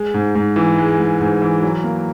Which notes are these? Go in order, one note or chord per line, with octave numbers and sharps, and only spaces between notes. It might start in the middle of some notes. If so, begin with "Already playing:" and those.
Already playing: G#3
G#2
G#2
E3
G#3
G#2
G#2
E3
F#3
A#3